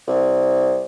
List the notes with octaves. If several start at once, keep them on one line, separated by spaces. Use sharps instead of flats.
C2